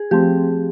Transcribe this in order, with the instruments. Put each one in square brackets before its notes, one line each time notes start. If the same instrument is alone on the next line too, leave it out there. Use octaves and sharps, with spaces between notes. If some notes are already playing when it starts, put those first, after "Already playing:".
Already playing: [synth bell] G#4
F3 A3 C4 G4